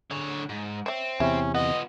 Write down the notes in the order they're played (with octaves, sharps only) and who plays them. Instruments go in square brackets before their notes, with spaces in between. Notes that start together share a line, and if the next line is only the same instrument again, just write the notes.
[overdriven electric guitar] D3 C#5 [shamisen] G#4
[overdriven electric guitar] G#2
[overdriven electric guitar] C4 [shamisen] C#5 E5
[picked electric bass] E2 C3 [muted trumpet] C#4 [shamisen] E4
[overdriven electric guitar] B3 F4 [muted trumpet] D#5 [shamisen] F#5